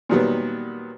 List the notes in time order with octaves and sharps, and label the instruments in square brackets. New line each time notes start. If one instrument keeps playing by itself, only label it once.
[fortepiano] A#2 D#3 F#3 G3 B3